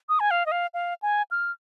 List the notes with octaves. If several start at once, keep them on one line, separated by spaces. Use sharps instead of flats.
D#6
G#5
F5
D#5
F5
F5
G#5
F6